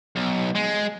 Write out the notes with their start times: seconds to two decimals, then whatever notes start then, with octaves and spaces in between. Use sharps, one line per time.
0.16 B1
0.55 G#3